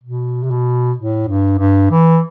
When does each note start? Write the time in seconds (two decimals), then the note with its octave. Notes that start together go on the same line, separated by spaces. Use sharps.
0.03 B2
0.43 C3
0.51 B2
0.98 A2
1.28 G2
1.59 G2
1.91 E3